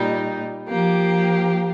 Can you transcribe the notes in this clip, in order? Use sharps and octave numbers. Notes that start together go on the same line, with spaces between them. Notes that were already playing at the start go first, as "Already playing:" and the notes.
Already playing: A#2 G3 D#4
F3 A#3 G4